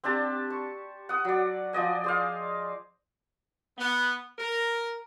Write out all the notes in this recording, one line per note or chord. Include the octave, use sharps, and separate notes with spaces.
C4 D4 G4 A5
C#6
F#5 D#6
F#3 D5
F3 D5 D#5 G#5
G#4 C5 F5
B3
A#4